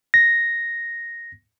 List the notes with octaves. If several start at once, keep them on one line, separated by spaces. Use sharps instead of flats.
A#6